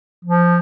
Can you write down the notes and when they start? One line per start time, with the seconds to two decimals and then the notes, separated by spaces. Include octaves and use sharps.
0.25 F3